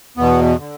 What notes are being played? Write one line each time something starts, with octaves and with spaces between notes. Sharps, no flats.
E2 B2 B3
D3